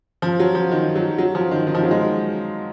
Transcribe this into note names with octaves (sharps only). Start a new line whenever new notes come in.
F3
F#3
F3
D#3
F#3
F#3
F3
D#3
D#3
F3
F#3
G#3